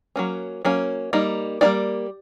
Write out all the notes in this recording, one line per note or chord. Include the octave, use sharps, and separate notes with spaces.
F#3 A#3 C#4
F#3 A#3 C#4
G3 A#3 D#4
G3 A#3 D#4 D5